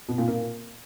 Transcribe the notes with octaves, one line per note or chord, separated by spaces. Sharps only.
B2
A#2
A#3